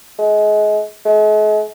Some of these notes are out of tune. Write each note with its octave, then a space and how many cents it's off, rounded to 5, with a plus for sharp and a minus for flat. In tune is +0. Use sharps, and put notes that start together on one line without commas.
G#3 +30
G#3 +45